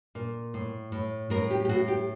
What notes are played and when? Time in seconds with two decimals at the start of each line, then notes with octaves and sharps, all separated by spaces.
0.15 A#2
0.54 A2
0.92 A2
1.30 A2 A#4
1.50 G4
1.65 G4
1.69 A2 F#4
1.88 G4